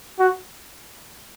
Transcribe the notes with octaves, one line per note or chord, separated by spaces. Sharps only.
F#4